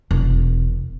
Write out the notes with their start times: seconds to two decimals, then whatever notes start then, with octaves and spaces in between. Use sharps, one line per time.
0.11 E1